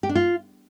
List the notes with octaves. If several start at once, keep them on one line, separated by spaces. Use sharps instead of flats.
G4
D4
F4